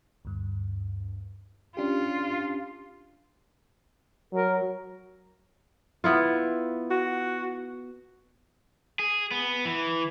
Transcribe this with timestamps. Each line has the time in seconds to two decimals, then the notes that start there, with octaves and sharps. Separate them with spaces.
0.25 D2 G2
1.77 C#4 D4 F4 G4
4.33 F#3 A#4
6.04 B3 E4 F4
6.91 F#4
8.99 G#4
9.31 B3
9.65 E3